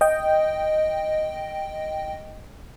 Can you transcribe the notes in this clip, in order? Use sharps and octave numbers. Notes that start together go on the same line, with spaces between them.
D#5 G5